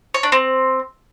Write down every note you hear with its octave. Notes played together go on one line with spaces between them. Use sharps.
C#5
D4
C4